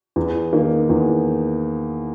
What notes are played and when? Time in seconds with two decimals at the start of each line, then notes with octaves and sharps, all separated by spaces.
0.16 E2
0.53 D#3 A#3 D#4
0.89 E2